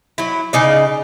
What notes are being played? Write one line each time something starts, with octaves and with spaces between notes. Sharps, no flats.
F#3 E4
C#3 D#4 D5